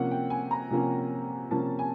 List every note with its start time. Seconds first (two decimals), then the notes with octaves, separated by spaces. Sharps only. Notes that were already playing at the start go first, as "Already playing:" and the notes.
Already playing: C3 F3 A#3 C#4 F#5
0.11 G5
0.30 G#5
0.51 A#5
0.71 C3 F3 A#3 C#4
1.51 C3 F3 A#3 C#4 A5
1.79 G#5